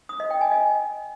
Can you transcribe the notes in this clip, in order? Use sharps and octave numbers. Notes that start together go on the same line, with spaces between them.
D#6
D#5
G5
G#5
D#5